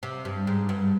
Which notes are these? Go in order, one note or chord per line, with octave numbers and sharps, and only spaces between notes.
C3
G2
G#2
G2